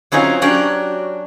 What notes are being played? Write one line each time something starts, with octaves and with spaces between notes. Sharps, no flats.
F#3 C4 C#4 D#4 F4
F#3 C#4 D4 F#4 G4